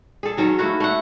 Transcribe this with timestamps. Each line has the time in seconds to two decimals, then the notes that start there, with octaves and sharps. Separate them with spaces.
0.23 G#4 A4
0.37 D#3 F#3 C#4 A4
0.59 A3 A#3 E4 F#4
0.80 A3 F#5